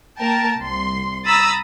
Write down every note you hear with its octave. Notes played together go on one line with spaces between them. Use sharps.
A#3 A#4 G5 A5
C2 C6
A#5 B5 D#6 E6 A6